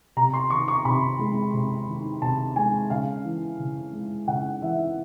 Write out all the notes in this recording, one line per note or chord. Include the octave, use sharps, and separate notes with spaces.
C3 A#5
C6
D#3 C#6
C#6
C3 B5
G#3
C3
D#3
C3 A5
G#3 G#5
C#3 F5
E3
C#3
G#3
C#3 F#5
E3 E5